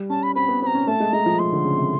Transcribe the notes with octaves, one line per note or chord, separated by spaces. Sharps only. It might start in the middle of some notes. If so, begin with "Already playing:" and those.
Already playing: G3
C#4 A5
B5
C4 B5
B3
C4 A#5 B5
C#4
A3 A5
G#3
G#3 A#5
F3
F3 C6
D3
C#3
C3